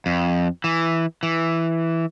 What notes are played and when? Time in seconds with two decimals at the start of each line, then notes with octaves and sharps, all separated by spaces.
0.06 F2
0.64 E3
1.23 E3